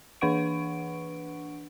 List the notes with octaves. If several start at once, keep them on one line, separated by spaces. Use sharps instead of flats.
E3 D4 B4 F#5 C#6 D7